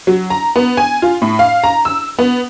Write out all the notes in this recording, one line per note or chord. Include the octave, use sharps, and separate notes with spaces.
F#3
A#5
B3
G#5
F4
A2
F5
A#5
E6
B3